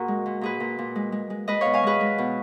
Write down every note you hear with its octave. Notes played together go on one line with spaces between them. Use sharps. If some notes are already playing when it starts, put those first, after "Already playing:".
Already playing: A#2 F#4 G#4 A#4
G#3
A#2
A#2 G#4 B4
A#2
A#2
G#3
G#3
G#3
G#3 B4 D#5
B2 C#5 F5
F5 G#5
G#3 G#4 B4
G#3
B2